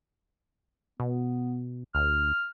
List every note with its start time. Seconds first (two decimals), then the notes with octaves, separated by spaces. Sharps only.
1.00 B2 B3
1.95 D2 F6